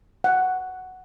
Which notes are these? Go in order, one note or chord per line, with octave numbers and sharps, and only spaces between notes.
F#5